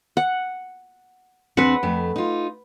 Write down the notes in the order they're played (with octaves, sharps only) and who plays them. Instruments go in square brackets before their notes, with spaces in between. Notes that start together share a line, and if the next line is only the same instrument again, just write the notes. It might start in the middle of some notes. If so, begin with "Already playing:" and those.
[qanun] F#5
[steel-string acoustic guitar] E2 C4 D4 [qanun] B4 F#5
[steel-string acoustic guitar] F2 A3
D#4 F4